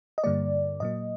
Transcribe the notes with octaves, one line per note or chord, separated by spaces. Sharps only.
D#5
G2 D3 G3 A#3 D5
A#2 F#3 A#3 D#5